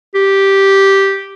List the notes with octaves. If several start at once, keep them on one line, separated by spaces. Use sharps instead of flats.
G4